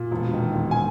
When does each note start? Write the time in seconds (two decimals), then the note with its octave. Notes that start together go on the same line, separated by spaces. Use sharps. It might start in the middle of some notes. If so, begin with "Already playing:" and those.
Already playing: A#2
0.11 E1
0.34 D#3
0.55 E1
0.71 G#5